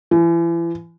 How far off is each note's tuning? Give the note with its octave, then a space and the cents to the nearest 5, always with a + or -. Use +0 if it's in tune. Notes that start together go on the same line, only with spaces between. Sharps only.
E3 +35